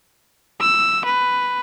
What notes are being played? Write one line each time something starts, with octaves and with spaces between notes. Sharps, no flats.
E6
B4